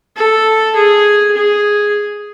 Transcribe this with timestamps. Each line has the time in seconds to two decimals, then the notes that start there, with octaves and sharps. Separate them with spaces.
0.16 A4
0.76 G#4
1.37 G#4